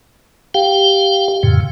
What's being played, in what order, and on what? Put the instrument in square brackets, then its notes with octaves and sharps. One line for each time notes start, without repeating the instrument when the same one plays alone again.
[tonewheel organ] G4 F5 G5
F2 A2 C#3